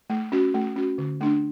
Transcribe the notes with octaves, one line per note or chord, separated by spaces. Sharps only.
A3
C#4 F#4
A3
C#4 F#4
D3
A3 D4